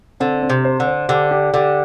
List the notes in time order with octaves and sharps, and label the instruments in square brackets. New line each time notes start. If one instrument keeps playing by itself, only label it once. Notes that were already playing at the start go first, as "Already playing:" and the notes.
[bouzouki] D3 [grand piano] C4
[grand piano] C4
[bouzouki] C3
[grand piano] C5
[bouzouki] D3
[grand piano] C5
[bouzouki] D3 [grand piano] G4
[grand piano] G4
[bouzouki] D3 [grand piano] G4